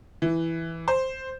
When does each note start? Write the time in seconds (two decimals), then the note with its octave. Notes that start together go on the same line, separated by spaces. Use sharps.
0.22 E3
0.88 C5